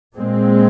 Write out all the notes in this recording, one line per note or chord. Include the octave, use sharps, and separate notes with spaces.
A#2 G#3 C4